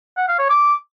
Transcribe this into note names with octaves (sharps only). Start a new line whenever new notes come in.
F#5
F5
C#5
D6